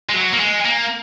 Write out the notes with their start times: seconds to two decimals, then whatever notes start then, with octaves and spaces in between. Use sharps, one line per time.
0.09 G#3
0.14 F#3
0.32 A#3
0.40 G#3
0.65 A#3